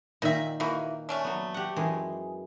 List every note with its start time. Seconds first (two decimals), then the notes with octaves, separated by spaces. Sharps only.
0.22 A#2 D#3 D#4 E5
0.60 E3 A#3 D#4 F#4
1.09 A3 C#4 D4
1.24 F#3 B3
1.54 G4 F#5
1.76 F#2 E3 G#3